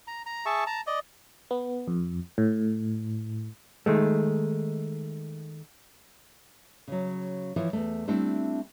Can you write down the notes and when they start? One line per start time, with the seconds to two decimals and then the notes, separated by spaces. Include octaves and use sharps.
0.07 A#5
0.26 A#5
0.46 G#4 E5 A5 C#6
0.67 A5 A#5
0.87 D5 D#5
1.51 B3
1.88 F2
2.38 A2
3.86 D#3 G#3 A3
6.88 C#3 F#3
7.56 E3 F3 E4 C#5
7.73 E2 A3
8.08 G3 A3 C4 D4 E4